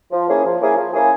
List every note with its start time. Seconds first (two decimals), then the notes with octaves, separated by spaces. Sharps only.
0.11 F3
0.28 A#3 C#4 E4 G#4
0.45 F3
0.61 A#3 C#4 E4 G#4
0.76 F3
0.93 A#3 C#4 E4 G#4